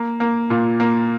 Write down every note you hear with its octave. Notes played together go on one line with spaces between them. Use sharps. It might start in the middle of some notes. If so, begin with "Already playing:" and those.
Already playing: A#3
A#3
A#2
A#3